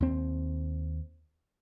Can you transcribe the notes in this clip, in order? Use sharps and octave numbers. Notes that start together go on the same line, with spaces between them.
D#2 C4